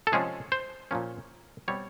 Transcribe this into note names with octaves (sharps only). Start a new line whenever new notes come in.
A4
C3 F3 G#3 C#4 G#4
C5
A#2 F3 A#3 C#4
B2 G3 C4 C#5